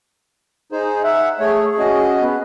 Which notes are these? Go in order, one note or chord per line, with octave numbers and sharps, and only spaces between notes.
D#4 G#4 C5
E5 F#5
A3 G#4 C#5
C#4 F#4 D#5
B3